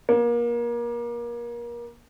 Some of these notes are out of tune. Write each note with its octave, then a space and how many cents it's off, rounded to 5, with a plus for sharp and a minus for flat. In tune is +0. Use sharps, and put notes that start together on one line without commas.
A#3 +30